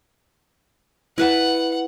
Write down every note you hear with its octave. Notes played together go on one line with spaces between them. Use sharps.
E4 B4 F#5 A5